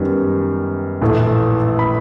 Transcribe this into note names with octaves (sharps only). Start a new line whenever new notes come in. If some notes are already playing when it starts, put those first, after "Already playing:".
Already playing: F#2 D#3 G3 B3
A#1 A2 E3 A3
B5